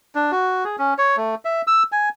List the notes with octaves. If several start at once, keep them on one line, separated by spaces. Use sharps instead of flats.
D4
F#4
G#4
C#4
C#5
A3
E5
E6
G#5